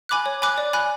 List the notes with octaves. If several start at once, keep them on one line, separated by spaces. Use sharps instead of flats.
G#5 B5 D6 F#6
C#5
G#5 B5 D6 F#6
D5
G#5 B5 F#6